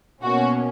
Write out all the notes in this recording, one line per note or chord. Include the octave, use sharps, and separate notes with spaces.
B2 A#3 C#4 F#4